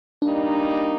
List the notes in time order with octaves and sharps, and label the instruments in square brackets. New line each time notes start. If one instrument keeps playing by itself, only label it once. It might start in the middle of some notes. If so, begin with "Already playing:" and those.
[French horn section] G3 A#3 D#4 [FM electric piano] D4